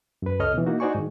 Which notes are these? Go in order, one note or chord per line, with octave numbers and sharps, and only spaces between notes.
F#2 B4
C#2 A4 C#5 D#5 F6
B2 E3
A#3 D#4 E4 F#4
D#4 F#4 C5 D5 G#5 C#6
G#2 D#3